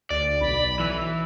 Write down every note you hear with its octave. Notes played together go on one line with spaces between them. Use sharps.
D2 D5
B1 B5
E3 E6